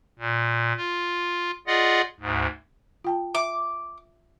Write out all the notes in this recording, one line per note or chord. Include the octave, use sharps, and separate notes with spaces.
A#2
F4
F4 G#4 D5 D#5 F#5
D2 G#2
F4 G5 A5
E5 D6